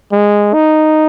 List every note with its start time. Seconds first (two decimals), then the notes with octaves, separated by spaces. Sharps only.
0.13 G#3
0.54 D#4